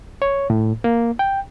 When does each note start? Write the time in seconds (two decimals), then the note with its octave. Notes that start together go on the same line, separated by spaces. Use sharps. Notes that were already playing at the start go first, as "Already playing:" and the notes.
0.22 C#5
0.50 A2
0.84 A#3
1.19 G5